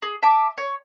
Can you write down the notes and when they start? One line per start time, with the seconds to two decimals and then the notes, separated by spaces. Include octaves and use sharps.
0.02 G#4
0.23 E5 A5 D6
0.58 C#5